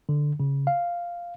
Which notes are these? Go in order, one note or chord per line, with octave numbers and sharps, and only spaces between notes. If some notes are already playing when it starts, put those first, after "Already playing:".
D3
C#3
F5